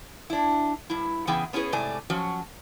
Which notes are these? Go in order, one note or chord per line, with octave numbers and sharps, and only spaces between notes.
D4 E4
G2 E4
C#3 E3 B3 E4 G#4 G5
B3 C#4 E4 F#4 G#4 B4
G#2 C3 A3 D5 G#5
F3 F#3 C#4 F#4